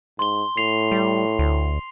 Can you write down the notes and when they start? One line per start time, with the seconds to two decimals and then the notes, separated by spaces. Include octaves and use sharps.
0.19 G#2 C6 G7
0.57 A2 C7 F7
0.92 G3
1.39 D2